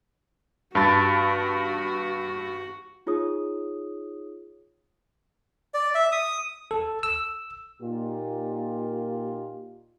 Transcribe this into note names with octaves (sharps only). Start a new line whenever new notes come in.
G2 F#4 A5 B5 A6
D#4 F4 G#4 C#5 D#6
D5
E5
D#6
A4
E6
A#2 A#3 D#4 F4 G4